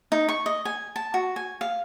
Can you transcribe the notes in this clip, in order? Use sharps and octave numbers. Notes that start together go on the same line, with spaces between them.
D#4
C#6
D#5
G#5
A5
F#4
G#5
F5